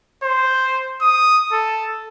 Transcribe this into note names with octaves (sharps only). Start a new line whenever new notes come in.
C5
D#6
A4